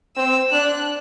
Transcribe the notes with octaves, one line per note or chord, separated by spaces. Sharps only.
C4 E6
D4 F#6